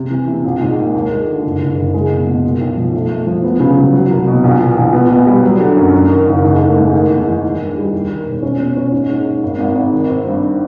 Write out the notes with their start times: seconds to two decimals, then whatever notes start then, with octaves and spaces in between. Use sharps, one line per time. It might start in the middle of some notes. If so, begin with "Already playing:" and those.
Already playing: C3
0.10 E3
0.28 C3
0.44 A#1
0.61 G#2
0.78 A#3
0.94 D#2
1.11 G#3
1.27 D3
1.44 F#1
1.60 F#1
1.77 F#1
1.94 G#3
2.11 B2
2.27 B2
2.43 A#2
2.61 B1
2.77 F3
2.93 A3
3.10 A3
3.27 F3
3.43 B3
3.60 C#3
3.76 F#3
3.93 F#3
4.10 C2
4.27 B2
4.44 A#1
4.60 E3
4.77 A#1
4.93 B3
5.10 B2
5.27 G3
5.43 F#3
5.60 D3
5.77 F#2
5.93 F#2
6.09 D#3
6.26 F#1
6.44 G#2
6.59 A3
6.77 G#2
6.92 D#3
7.10 E2
7.26 E2
7.43 D#3
7.59 G2
7.77 G3
7.93 D#2
8.09 D#3
8.26 E1
8.42 C#4
8.59 B2
8.77 C#4
8.92 G#2
9.09 G#2
9.26 G#2
9.43 G#1
9.60 G#1
9.75 G#1
9.93 D#3
10.10 C4
10.26 G2